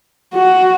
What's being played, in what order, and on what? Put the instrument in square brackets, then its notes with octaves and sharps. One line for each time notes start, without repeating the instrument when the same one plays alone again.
[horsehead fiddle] F#4